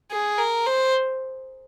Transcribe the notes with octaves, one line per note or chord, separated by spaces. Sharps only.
G#4
A#4
C5